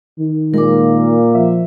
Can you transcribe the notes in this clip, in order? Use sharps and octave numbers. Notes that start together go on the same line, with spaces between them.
D#3
A#2 G#3 A#4 D6
F3 E5